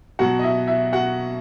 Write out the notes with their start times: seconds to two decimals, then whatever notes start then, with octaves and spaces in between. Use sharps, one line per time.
0.19 B2 F#3 F#4 F#5
0.39 D#5
0.43 E4 E5
0.68 E4 E5
0.93 F#4 F#5